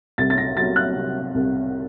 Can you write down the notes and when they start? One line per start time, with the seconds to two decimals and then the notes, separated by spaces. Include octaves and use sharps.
0.18 C2 A6
0.30 A6
0.38 A#6
0.56 F#3 A6
0.76 F#6
0.95 C3
1.35 C2